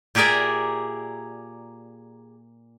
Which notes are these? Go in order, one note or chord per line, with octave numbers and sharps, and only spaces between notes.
A#2 G4 G#4 A#4 D5 E5